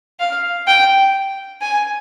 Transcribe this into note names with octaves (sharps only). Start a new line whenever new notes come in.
F5
G5
G#5